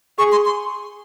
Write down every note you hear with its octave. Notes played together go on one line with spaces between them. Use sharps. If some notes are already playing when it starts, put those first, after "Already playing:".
G#4 C#6
C6
C6